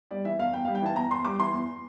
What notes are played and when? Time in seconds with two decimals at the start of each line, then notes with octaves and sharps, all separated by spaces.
0.11 G3 D5
0.25 E3 E5
0.39 E2 F5
0.53 E2 G5
0.65 F5
0.68 G3
0.75 G5
0.82 E3 A5
0.96 E2 A#5
1.11 E2 C6
1.25 G3 D6
1.39 E3 C6
1.54 E2